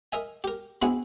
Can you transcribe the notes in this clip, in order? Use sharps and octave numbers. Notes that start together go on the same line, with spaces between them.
A#4 D#5 E5 G#5
G4 A#4
B3 C4 D4 E4 F#4 G#4